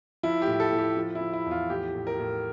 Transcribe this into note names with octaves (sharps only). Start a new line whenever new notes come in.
F3 E4
G4
A2
A4
A2
G4
F3
E4
F3
E4
E2
F4
A2 G4
A2
A#4
A2